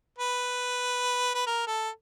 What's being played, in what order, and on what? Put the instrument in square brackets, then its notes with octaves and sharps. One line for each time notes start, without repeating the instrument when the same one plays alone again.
[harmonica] B4
B4
A#4
A4